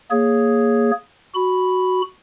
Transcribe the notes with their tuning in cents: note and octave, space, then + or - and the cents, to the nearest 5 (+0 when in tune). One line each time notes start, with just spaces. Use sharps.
A#3 +0 G#4 +0 C#5 +0
F#4 +0 B5 +0